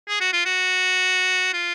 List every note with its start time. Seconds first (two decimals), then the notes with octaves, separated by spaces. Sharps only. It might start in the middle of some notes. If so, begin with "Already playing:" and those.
0.08 G#4
0.21 F#4
0.33 F4
0.45 F#4
1.54 F4